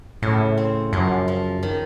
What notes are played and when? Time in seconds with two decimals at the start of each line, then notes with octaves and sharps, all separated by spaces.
0.22 A2 C#3
0.57 C4
0.93 F#2 F3
1.28 F3
1.63 D#3